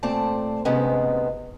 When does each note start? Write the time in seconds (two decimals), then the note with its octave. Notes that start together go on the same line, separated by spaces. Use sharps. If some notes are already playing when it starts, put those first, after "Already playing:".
0.03 A#2 A3 C4 C5 D5 A5
0.65 D2 G#2 C3 G#3 B3 C#4